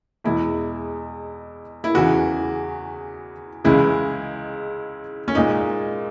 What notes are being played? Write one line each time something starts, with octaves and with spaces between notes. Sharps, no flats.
E2 B2 G#3 E4
E4
E2 C#3 E3 F#4
C#2 C#3 E3 G#3 E4
C#4
A#2 G#3 D#4